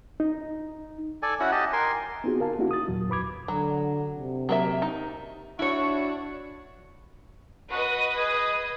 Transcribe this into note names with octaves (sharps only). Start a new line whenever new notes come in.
D#4
A4 D5 G#5
C#4 E4 F#4 F#5
G4 D#5 A5
A#4 G#5 C6
B3 C4 D#4 F4 F#4 G#4
A#4 F5 A5
A#3 C#4 D#4 E4 F#4 G4
D#6 A6
D#2 A#2 F#3
F2 B4 B5 D6 G#6
D3 F#3
C3
F#3 A#3 E5
D#4
D4 E4 F#4 C#5
F#4 B4 D#5 D#6
G#4